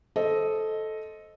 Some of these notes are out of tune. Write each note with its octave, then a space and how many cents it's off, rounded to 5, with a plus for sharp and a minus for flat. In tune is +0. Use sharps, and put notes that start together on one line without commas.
A4 -10 C5 +10 D#5 +0